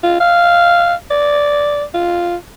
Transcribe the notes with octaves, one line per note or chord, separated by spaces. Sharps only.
F4
F5
D5
F4